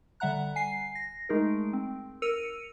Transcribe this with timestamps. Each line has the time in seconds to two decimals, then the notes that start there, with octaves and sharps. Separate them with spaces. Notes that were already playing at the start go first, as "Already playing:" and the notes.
0.20 D3 G3 E5 F#5 A#5 F#6
0.56 G#5 C7
0.95 A#6
1.29 G#3 A3 D#4 G#4 A#4
1.73 C4
2.22 A#4 E6 C#7 D#7 F7